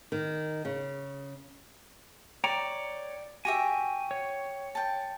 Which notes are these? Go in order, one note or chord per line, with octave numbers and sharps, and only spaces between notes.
D#3
C#3
C#5 D5 G5 A#5
F#4 G4 E5 G#5
C#5
G5 A5